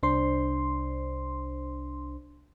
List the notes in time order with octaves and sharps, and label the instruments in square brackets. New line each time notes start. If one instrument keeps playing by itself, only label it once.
[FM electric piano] C2 D4 C5 C6